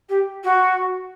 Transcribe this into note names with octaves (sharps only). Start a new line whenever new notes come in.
G4
F#4